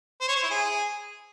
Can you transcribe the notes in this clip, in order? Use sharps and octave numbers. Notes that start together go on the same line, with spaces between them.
C5
C#5
C5
E4
G#4